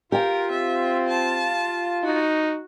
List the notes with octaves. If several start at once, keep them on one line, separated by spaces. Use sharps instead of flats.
F4 G4 A#4 G5
C4 E5
A5
D#4 F#4